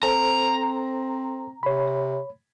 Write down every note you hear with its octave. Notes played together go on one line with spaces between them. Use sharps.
C4 A4 C5 A#5
C3 C#5 B5